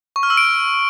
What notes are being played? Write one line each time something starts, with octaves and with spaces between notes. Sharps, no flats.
C#6
F6
E6
D7